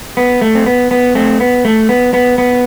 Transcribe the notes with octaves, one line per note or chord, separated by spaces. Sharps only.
B3
A3
C4
B3
B3
A3 C4
B3
A3
B3
B3
B3